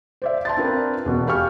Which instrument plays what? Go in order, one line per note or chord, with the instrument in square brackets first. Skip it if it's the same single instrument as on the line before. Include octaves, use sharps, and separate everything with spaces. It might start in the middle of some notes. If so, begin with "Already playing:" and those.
[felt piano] C5 D5 E5
A5 C6 A6
C4 D4 F4 A#4 B4
E1 B2
G4 B4 F5 G#5 C#6 F6